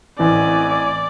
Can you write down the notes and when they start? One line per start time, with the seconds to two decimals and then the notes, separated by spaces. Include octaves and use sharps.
0.19 A1 E3 C4 D5 G#5